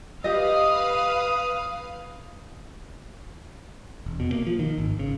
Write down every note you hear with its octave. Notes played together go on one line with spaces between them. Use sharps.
G4 B4 D#5 F5 D#6
E1
B2
A#3
F3
D#3
G#1
C#3